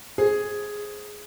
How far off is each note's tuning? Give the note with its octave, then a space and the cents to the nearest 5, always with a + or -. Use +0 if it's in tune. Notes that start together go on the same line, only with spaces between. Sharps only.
G#4 +0 C5 +0